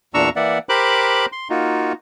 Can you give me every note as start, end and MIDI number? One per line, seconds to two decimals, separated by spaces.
0.14 0.29 40
0.14 0.29 46
0.14 0.29 62
0.14 0.29 82
0.14 0.29 85
0.14 0.29 88
0.36 0.58 52
0.36 0.58 58
0.36 0.58 74
0.36 0.58 76
0.36 0.58 78
0.69 1.26 67
0.69 1.26 70
0.69 1.26 72
0.69 1.26 83
0.69 1.26 86
0.69 1.26 90
1.32 1.48 84
1.50 1.93 58
1.50 1.93 63
1.50 1.93 65
1.50 1.93 66